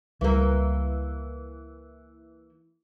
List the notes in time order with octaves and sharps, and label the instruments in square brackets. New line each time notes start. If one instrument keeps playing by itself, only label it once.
[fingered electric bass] C#2 G3 [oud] E3 A#3